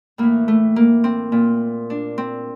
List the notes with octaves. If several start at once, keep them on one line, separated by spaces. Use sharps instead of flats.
A2 E3 A#3
A3
A#3
C4
A#2
D4
C4